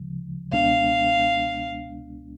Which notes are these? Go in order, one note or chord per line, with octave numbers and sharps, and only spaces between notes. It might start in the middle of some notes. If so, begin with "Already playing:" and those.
Already playing: D2 C#3 F3 G#3
C#2 B2 G#3 B3 D4 F5